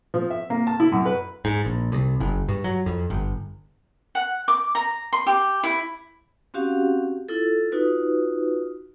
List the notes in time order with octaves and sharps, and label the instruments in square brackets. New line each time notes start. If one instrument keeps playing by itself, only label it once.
[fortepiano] F3
E5
A#3
A5
E4
F#2
B4
[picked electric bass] G#2
A#1
C2
F#1
G2
F#3
F2
G1
[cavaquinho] F#5
D6
A#5
C6
G4
E4
[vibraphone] C4 C#4 F#4 G4 F5 F#5
E4 F4 A4
D#4 F4 F#4 B4